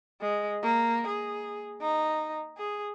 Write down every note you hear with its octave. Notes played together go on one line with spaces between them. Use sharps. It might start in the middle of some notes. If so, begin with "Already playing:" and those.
G#3
A#3
G#4
D#4
G#4